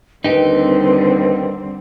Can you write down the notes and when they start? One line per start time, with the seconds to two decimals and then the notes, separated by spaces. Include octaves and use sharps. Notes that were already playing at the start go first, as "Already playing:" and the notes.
0.24 D#2 D3 G3 C4 D#4 G4 B4